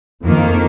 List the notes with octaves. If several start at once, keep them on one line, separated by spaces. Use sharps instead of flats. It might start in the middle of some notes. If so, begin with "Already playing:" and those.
F2 D#3 A#3